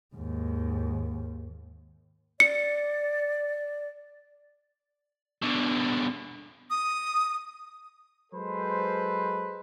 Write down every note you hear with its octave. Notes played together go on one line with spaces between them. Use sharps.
D#2 G#2
D5 C#7
B2 D3
D#6
F#3 G#3 A4 B4 C5